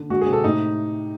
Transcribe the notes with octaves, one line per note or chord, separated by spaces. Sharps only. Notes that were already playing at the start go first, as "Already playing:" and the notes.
Already playing: D3
G#3 F#4
G#4
C3
A4
A2 D#4